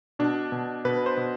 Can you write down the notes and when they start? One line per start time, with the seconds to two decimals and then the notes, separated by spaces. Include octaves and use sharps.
0.19 B2 D4
0.52 B2
0.85 B2 B4
1.06 C5
1.17 B2